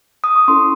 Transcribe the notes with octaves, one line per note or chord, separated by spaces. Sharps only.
D#6
C#6
C#4 E4 A4 C6